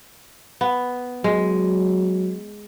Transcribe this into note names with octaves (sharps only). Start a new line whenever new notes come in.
B3
F#3 G#3